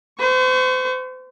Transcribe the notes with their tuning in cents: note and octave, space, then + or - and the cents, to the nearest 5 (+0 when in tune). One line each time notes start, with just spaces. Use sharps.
C5 -40 C#6 +0